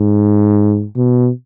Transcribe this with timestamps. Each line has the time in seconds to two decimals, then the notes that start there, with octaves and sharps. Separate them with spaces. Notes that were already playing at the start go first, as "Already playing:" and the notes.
Already playing: G#2
0.96 B2